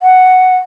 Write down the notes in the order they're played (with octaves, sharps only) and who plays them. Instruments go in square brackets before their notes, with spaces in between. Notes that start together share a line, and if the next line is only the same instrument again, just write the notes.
[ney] F#5